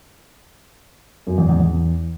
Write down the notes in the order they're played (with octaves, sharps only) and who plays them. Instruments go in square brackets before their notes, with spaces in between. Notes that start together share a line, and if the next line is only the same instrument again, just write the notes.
[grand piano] F#2
E2
E2
E2